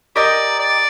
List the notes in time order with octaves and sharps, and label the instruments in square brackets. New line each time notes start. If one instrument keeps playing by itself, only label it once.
[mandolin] G4 A#4 D#5 [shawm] D5
[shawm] D5